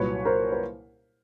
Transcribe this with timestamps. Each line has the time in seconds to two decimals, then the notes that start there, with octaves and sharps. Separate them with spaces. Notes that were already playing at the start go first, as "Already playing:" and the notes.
Already playing: C2 A#2 F#3 B4 C#5
0.25 A#4 C5
0.52 B4